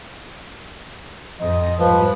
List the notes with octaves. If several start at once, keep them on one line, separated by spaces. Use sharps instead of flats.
F2 D#5
G#2 F3 G3 B4